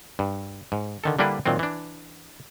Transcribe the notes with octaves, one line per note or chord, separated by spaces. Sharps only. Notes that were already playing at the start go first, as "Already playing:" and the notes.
G2
G#2
D3 D#3 A4
D3 G3 A#3 D4 E4 B4
A#2 D#3 F#3 C4
E3 D4